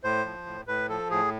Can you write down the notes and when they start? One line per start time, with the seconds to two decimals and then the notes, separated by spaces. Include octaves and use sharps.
0.04 A2 C5
0.25 F3
0.46 A2
0.67 A2 B4
0.89 F3 A4
1.10 A2 G#4